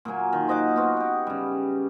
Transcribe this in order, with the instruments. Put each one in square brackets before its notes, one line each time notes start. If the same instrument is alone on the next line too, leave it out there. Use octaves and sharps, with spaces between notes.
[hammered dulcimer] A#2 F#3 A#3 G#5
D#3
C5 D#5 F#5 D6
B3 F4 F#4
G4 F#5
C#3 G3